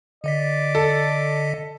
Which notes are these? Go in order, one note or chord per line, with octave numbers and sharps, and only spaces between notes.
D3 D5 D#5 B6
A4